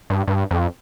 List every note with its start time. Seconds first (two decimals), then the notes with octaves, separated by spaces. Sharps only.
0.10 G2
0.28 G2
0.51 F2